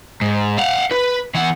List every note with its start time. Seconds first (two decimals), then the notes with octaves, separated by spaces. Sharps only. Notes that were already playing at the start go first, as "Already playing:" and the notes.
0.22 G#2
0.58 F5 F#5
0.92 B4
1.35 E2 F#5